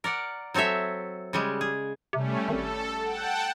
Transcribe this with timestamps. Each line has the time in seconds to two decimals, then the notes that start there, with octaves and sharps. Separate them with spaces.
0.04 A#4 D5 F#5
0.54 F#3 C4 A4 C#5 E5
1.33 C#3 G3 G#3
1.61 G#4
2.13 C3 G3 A3 C#4
2.48 G#1 A4
3.02 F#5 G5 A5